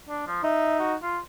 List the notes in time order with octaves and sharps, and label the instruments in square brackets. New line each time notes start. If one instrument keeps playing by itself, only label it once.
[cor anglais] D4
F3
[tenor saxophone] D#4 [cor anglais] E5
[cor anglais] F#4
F4